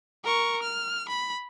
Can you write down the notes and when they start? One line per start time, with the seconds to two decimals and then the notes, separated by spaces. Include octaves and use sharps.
0.24 A#4 C#6
0.62 F6
1.09 B5